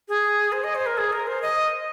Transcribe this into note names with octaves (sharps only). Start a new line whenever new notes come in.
G#4
C5
D#5
C5
A#4
G#4
A#4
C5
D#5